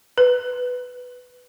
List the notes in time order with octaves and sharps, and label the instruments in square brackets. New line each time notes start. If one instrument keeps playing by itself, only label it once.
[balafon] B4